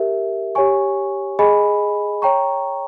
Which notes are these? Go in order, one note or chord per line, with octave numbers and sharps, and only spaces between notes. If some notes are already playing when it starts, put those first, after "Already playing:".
Already playing: G4 A#4 E5
G4 C#5 G#5 C#6
G#4 D#5 G#5 B5
C#5 G5 A#5 C#6